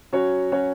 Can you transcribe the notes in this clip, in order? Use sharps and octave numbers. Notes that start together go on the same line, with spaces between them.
F#3 C#4 F#4 C#5
F#3 C#4 F#4 C#5